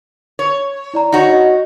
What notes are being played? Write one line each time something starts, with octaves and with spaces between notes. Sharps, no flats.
C#5
E4 D5 A#5
D#4 F#4 C#5
D#5